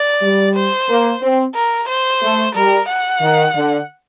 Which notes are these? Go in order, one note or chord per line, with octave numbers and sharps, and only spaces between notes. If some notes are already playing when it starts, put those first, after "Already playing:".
Already playing: D5
G3
C5
A#3
C4
A#4
C5
A3
G3 A#4
F#5
D#3
D3